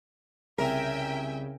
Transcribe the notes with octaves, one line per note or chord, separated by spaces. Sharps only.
C2 C#3 A#4 E5 G5 G#5